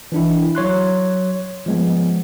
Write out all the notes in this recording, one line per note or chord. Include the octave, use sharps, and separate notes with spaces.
E3 D4 E4
F#3 C#5 C6 F#6
F3 G#3 B3